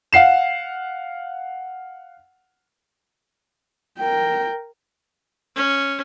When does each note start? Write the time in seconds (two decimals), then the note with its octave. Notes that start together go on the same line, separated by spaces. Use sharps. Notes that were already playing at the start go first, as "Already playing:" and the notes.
0.13 F5 F#5 C7 E7
3.98 A#4 G5
5.56 C#4